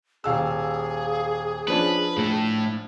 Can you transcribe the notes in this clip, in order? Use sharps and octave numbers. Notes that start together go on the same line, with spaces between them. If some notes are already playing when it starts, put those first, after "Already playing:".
D#1 G#4 F5 E6
F3 C#4 D4 B4
A2 A3